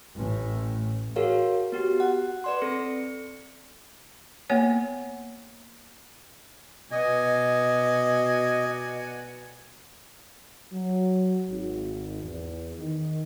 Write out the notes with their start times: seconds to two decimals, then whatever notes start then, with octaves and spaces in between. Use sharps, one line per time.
0.16 A1 A2
1.16 F#4 G#4 A#4 C#5 F5
1.72 B3 F#4 G4
2.00 F#5
2.44 B4 D5 C6
2.62 C4 A4 C#7
4.50 A#3 B3 C#5 F#5
6.92 B2 F#4 D5 D#5 G#5
10.72 F#3
11.49 G#1
12.23 E2
12.79 D#3